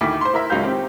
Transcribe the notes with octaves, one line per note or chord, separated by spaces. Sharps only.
D2 D#3 E4 D6 B6
C5 C6
E4 A#4 E5
C#2 F#3 C#4 A#4 F5 G6
D#3 C4 G4